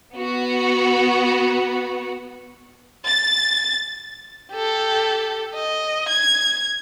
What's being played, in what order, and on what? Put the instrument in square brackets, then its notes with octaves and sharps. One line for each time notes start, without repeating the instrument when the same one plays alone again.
[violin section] B3 F#4
[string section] A6
[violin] G4 A4
D#5
G#6